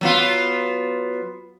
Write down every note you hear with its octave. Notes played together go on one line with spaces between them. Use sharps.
F#3 B3 F4